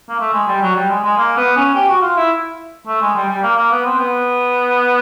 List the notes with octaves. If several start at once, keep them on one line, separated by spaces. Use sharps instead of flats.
A#3
A3
G#3
G3
F#3
G3
G#3
G#3
A#3
B3
C#4
G4
F#4
F4
E4
A3
G#3
G3
G3
A#3
A#3
B3
C4
B3